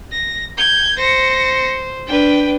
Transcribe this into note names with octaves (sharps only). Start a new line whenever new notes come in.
A#6
G6 G#6
C5 A#6 C#7
D4 B4 G5